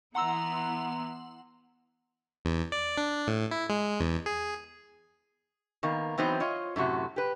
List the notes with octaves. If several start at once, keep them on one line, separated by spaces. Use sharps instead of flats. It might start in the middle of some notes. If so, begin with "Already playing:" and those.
E3 B3 E4 F#5 A#5 C6 E6
E2
D5
D4
A2
E4
G#3
E2
G#4
D#3 A#3 B3
E3 F#3 B3 C4 D#4 C5
F4 C#5 D#5
F#2 A2 C3 F#4
G4 B4